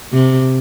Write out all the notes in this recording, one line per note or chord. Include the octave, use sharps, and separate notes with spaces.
C3